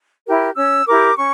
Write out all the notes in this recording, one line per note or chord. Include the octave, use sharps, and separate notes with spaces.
E4 G4 A#4
C#4 E6
E4 G4 A#4 D6
C#4 C#6